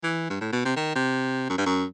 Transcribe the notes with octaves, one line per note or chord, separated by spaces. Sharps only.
E3
G2
A2
B2
C3
D#3
C3
F#2
G2
F#2